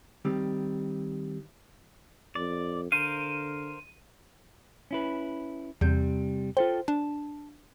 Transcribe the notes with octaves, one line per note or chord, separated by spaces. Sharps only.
D#3 G3 C4
F2 D5
D3 A#4 C5 F5 D#7
C#4 E4 B4
E2 C3 G3 G6
F4 A4 C5 G5
D4 A5